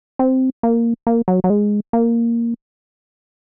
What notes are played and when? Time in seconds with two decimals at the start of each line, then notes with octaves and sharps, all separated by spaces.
0.19 C4
0.63 A#3
1.07 A#3
1.28 F#3
1.44 F#3
1.50 G#3
1.93 A#3